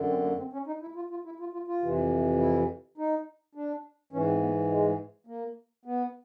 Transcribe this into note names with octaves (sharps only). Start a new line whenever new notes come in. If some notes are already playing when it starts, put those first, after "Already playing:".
Already playing: F#2 D3
C4
A#3
C4
C#4
D#4
E4
F4
F4
E4
F4
F4
F4
F2 C3 E3
E4
D#4
D4
G#2 E3 C#4
C4
B3
G#3
A#3
B3